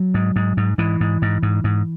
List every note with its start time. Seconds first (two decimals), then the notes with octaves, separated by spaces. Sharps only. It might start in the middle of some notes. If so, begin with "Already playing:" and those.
Already playing: F#3
0.14 G#2
0.36 G#2
0.57 G#2
0.78 G#2 E3
1.01 G#2
1.22 G#2
1.43 G#2
1.64 G#2